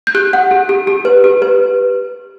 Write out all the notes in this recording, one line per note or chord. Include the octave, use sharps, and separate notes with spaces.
G6
G4 F#6
F#5
G4
G4
G4
B4
G4
B4